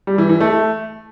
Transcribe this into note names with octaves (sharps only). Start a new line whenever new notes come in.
G3
E3
E3
A3